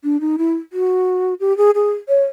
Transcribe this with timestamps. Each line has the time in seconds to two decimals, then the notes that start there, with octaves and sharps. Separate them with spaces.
0.04 D4
0.21 D#4
0.38 E4
0.73 F#4
1.40 G4
1.57 G#4
1.75 G#4
2.09 C#5